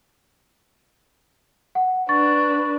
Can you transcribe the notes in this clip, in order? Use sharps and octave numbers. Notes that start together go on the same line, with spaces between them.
F#5
D4 B4 C#6 A6